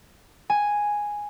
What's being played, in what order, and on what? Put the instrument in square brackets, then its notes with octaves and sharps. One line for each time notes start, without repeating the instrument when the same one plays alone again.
[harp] G#5